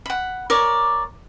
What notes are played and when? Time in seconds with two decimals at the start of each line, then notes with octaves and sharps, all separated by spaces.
0.06 F#5 B5
0.50 A#4 C#5 D5 D6